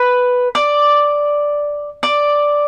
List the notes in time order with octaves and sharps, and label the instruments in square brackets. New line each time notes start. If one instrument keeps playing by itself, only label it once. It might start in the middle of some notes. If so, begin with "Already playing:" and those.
Already playing: [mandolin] B4
D5
D5